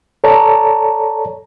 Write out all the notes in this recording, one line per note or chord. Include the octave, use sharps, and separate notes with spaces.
A4 C#5 D5 A5 A#5